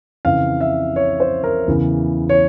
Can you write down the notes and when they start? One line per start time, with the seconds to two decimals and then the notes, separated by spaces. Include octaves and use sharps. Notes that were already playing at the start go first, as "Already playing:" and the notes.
0.25 F2 C#3 E3 F5
0.61 E5
0.96 C#5
1.20 C5
1.44 A#4
1.68 E2 C#3 E3
2.29 C#5